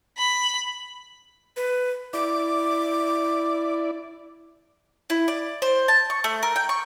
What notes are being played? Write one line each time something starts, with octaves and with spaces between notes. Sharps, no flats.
B5
B4
E4 D5 D6
E4
D5
C5
A5
C#6
A3
A#4
G5
C#6